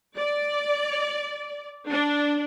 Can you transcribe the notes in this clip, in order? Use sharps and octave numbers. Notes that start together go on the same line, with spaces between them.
D5
D4